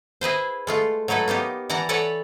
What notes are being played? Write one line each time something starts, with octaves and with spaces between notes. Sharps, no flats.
E4 G#4 B4 C5
G#3 A3 F4
F#3 D#4 E4 A4 B4
A#3 B3 D#4 G4
E3 D5 F#5 A5 A#5
A4 B4 C#5 D5 F#5 A5